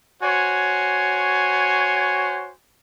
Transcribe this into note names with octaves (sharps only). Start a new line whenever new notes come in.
F#4 C5 C#5 G#5